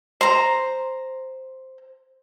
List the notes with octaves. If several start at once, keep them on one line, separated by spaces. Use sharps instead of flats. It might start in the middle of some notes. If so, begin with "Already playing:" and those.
C5 A#5